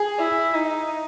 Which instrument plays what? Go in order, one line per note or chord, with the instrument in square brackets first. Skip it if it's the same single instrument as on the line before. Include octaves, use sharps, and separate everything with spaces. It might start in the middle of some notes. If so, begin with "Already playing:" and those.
Already playing: [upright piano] G#4
[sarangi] E4
D#4